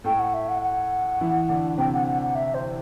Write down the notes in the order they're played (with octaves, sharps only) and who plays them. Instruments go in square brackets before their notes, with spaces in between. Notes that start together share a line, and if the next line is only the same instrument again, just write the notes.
[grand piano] A2 A3 [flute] G5
[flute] F#5
E5
F#5
F#5
[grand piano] E3 E4
D3 D4
[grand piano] C3 C4 [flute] G5
[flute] F#5
F#5
F#5
E5
C5